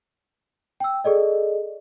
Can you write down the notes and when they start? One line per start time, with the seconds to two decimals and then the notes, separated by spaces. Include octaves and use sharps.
0.80 G5 E6
1.04 G#4 A4 D5 D#5